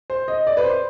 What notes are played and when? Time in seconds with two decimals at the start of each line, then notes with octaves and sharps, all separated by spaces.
0.10 C5
0.28 D#5
0.47 D5
0.57 B4
0.64 C5